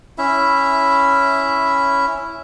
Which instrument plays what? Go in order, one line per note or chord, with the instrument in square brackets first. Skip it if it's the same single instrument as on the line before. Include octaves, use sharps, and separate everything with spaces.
[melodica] C#4 E4 E5